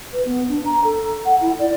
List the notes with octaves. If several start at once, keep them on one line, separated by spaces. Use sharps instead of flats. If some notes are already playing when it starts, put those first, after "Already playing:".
B4
B3
D4
A#5
A4
F#5
E4
D5